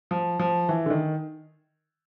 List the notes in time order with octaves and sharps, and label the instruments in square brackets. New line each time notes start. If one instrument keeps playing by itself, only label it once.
[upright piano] F3
F3
E3
D3
D#3